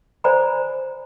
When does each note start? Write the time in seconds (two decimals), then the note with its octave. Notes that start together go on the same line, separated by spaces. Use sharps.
0.24 C5 D5 G#5 A#5 B5